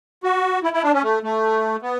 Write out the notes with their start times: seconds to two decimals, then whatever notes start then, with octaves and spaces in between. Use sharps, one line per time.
0.24 F#4
0.63 E4
0.73 E4
0.83 D4
0.93 C#4
1.03 A3
1.23 A3
1.82 B3